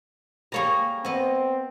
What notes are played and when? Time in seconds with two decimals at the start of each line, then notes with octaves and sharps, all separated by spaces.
0.52 G3 A#3 G#4 C#5 A#5
1.05 B3 C4 D#5